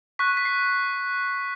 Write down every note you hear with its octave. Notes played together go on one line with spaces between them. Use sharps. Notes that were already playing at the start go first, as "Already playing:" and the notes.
C#6 F#6 B6
B6
C7